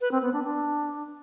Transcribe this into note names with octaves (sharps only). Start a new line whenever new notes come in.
B4
C4
B3
D4
D4